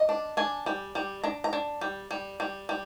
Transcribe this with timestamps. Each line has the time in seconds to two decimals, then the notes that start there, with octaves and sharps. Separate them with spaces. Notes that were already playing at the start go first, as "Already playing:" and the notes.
Already playing: D#5
0.09 D4
0.37 D4 G#5
0.66 G3
0.95 G3
1.23 D4 A#5
1.44 A#5
1.53 D4
1.81 G3
2.11 G3
2.40 G3
2.69 G3